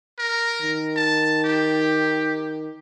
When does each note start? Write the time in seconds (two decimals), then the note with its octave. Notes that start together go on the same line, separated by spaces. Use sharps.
0.19 A#4
0.62 D#3
0.96 A5
1.44 G4